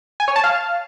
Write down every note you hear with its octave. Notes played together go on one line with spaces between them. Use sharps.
G#5
C#5
A5
F5